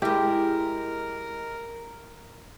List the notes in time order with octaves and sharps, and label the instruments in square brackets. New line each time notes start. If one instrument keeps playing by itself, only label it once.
[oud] G#3 E4 [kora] G4 [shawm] A#4